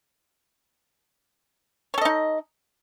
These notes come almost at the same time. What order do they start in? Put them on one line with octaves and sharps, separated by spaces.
C#5 A4 D#5 D#4